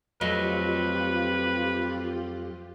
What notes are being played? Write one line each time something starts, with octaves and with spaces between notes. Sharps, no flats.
F2 F#3 A3 F4 G4 B4 D#5